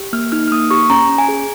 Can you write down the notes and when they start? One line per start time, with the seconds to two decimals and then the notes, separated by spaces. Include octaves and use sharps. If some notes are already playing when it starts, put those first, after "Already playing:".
Already playing: G4
0.13 A#3 F6
0.32 D#4 F6
0.48 F6
0.52 A#3 D#6
0.71 G4 C#6
0.90 C#4 A#5
1.09 C#4
1.18 G#5
1.29 G#4